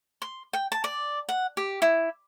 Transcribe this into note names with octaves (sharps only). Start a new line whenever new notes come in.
C6
G5
A5
D5
F#5
G4
E4